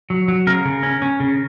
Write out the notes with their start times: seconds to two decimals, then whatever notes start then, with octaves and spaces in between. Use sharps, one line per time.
0.10 F#3
0.28 F#3
0.47 C#3 A#4
0.65 C#3
0.83 C#4
1.02 C#4
1.20 C#3